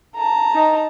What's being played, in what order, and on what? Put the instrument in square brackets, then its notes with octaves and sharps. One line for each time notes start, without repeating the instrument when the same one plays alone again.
[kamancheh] A5 A#5
[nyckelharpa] D#4 D#5